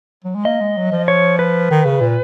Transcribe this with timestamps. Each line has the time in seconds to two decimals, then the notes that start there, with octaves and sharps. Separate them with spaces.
0.24 F#3
0.35 G#3
0.45 A#3 D#5
0.61 G#3
0.77 F#3
0.92 F3
1.08 C#5
1.39 B4
1.70 D#3
1.85 C#3
2.01 A#2